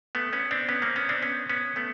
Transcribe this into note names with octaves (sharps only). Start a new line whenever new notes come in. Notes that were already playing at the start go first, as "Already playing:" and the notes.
A3 B3
B3 C#4
C4 D4
B3 C#4
A#3 C4
B3 C#4
C4 D4
B3 C#4
B3 C#4
A3 B3